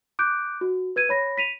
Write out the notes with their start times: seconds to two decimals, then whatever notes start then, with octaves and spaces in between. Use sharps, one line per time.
0.19 D6 F#6 G6 D7
0.61 F#4
0.96 B4 G#6 D#7
1.09 C#5 B5 A#6
1.37 B6 D#7 F7